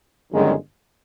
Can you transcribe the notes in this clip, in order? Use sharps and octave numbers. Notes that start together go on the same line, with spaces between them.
G1 F#2 D#3 G#3